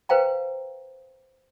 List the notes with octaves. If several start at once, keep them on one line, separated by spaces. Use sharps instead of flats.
B4 C5 F5 G5 A#5